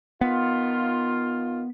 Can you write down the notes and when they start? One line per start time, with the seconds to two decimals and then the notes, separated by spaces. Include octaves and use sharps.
0.21 D#3 B3 F4